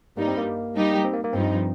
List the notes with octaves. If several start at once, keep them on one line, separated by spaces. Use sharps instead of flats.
G2 G3 A#3 D#4
C4
A#3
G3 D#4 G4
C4
A#3
A#3
G2 F3 C4 D#4